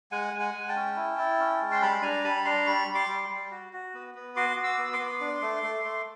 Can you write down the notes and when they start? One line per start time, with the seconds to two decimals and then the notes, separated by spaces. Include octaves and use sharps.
0.12 G#3 F#5 G#5
0.33 G#3
0.40 F#5 G#5
0.54 G#3
0.69 G5 A5
0.76 C#4
0.96 E4
1.18 E4
1.39 C#4
1.61 G#3
1.71 C6
1.82 G3 A5 B5
2.02 D4 G#5 A#5
2.24 G3 A5 B5
2.45 D4 A#5 C6
2.67 G3 B5 C#6
2.88 G3
2.94 C6 D6
3.08 G3
3.30 G3
3.51 F#4
3.73 F#4
3.94 B3
4.15 B3
4.36 F#4 C6 D6
4.56 F#4
4.64 D6 E6
4.78 B3
4.93 C6 D6
4.99 B3
5.20 D4
5.42 A3
5.63 A3
5.85 A3